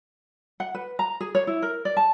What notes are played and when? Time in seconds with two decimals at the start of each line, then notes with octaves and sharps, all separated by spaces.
0.60 F#5
0.75 B4
0.99 A#5
1.20 G#4
1.35 C#5
1.47 E4
1.62 A#4
1.85 D5
1.97 A5